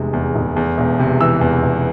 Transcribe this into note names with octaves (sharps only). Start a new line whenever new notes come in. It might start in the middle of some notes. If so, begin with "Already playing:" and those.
Already playing: F1 E2 C3 G#3
E2
F1
E2
E1
C3
E3 E6
E2
E1